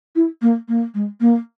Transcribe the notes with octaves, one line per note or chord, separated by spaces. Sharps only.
E4
A#3
A#3
G#3
A#3